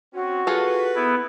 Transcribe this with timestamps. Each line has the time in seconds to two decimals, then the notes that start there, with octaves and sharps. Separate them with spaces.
0.13 C4 C#4 F#4
0.47 F4 G#4 A4 B4
0.95 B3 E4